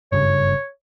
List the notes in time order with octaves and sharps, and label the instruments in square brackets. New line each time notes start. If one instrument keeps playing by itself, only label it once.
[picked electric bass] F#1 G2 C#3 [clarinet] C#5